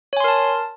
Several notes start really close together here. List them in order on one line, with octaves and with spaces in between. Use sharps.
C#5 G#5 C6 A#4 A5